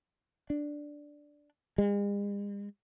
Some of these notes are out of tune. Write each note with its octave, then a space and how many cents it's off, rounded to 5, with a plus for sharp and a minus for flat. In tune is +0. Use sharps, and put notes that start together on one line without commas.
D4 +0
G#3 -45